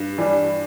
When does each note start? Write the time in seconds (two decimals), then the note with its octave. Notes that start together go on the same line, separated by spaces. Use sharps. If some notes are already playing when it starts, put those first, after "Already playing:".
Already playing: G2
0.18 E3 G3 D4